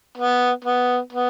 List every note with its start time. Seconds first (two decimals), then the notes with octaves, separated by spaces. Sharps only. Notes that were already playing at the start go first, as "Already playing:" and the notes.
0.18 B3
0.65 B3
1.13 B3